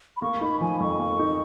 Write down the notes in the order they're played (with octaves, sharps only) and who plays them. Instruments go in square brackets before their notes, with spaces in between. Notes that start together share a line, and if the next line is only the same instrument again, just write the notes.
[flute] B5
[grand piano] A#3 [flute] C#6
[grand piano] D#4 [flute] B5
[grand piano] F3 [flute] G#5
[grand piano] F2 [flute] C#6
[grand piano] A#3
D#4